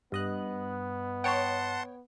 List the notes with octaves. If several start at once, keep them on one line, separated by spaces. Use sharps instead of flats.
G2 B3 D#5 F#6
C#5 F#5 G5 A5 C6